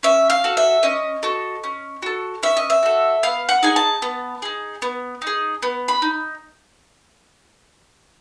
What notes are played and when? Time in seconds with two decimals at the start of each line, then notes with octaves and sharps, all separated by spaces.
0.03 C#4 E5
0.30 F5
0.44 F#4 A4
0.57 E5
0.83 C#4 D#5
1.23 F#4 A4
1.64 C#4
2.03 F#4 A4
2.43 C#4 E5
2.57 D#5
2.70 E5
2.83 F#4 A4
3.23 B3 F5
3.49 F#5
3.63 D#4 G#4 G#5
3.76 A5
4.02 B3
4.42 D#4 G#4
4.82 B3
5.22 D#4
5.27 G#4
5.63 B3
5.88 B5
6.02 D#4